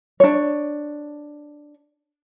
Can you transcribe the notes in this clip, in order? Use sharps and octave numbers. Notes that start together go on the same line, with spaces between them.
D4 C#5